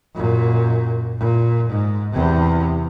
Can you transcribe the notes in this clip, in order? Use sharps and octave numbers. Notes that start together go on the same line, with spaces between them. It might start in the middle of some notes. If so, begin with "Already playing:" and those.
F#2 A#2
A#2
G#2
E2 C3